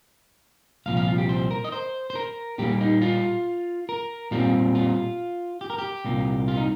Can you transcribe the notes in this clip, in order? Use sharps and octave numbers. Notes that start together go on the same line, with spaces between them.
C2 A#2 F3 F5
F5
F4
G4
C5
A#4
D#5
C5
C5
A#4
A#2 G3 A#3 G4
D#4
F4
A#4
A#2 G3 C4 F4
F4
G4
A#4
G4
C2 A#2 A#3
F4
D#4